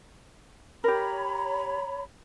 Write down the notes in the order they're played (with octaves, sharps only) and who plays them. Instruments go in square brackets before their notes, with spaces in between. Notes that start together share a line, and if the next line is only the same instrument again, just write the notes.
[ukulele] G4 A#4 [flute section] C#5 A#5 B5